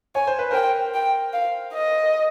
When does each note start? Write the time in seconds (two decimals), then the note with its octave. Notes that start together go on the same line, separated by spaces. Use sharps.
0.15 C#5 G#5
0.27 C5
0.39 B4
0.51 A#4 C5 G5
0.94 G5
1.33 F5
1.73 D#5